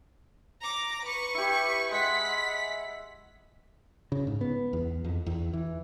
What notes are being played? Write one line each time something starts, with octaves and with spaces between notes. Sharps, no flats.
A#5 D6
B4 C#6
E4 G4
G#3 F#5 B6
C#3
G#2
B3
E2
F2
E2
E3